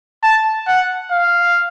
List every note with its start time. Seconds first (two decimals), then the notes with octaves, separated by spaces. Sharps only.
0.23 A5
0.67 F#5
1.11 F5